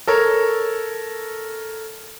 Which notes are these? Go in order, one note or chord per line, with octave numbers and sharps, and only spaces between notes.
A4 A#4 C#5